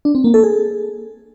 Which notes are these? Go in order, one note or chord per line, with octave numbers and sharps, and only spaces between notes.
D4
C4
A#3
A4
G#4